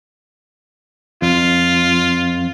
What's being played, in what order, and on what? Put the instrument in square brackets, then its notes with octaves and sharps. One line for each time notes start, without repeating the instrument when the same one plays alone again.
[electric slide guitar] F2 [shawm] F4